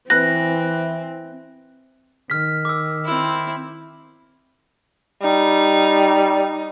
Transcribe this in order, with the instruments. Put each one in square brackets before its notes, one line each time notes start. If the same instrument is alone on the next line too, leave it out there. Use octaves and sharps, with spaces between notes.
[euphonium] E3 [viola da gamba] C4 [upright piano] B4 F#6 [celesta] A#6
[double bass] D#3 [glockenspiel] F6 B6
[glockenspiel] D6 E6
[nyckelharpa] C4 E4
[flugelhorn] G3 [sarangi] D#4